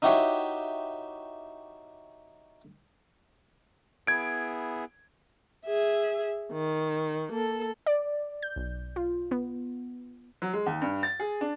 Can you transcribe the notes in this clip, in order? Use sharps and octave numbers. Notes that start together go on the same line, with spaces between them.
D#4 E4 F#4 G4 C#5 E5
B3 E4 G#4 G#6 D7
G#4 E5
D#3
A#3 A4
D5
G6
B1
F4
B3
F#3
G#3
D#2
G2
A6
G#4
D4